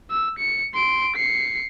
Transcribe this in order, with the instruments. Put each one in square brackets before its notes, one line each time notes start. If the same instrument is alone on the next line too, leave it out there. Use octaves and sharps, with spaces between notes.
[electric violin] E6
C#7
C6 D7
C7 C#7